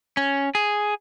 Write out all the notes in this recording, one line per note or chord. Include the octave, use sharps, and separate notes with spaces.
C#4
G#4